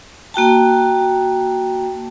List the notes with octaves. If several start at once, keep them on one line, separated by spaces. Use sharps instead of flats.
A#3 F#4 G5 A5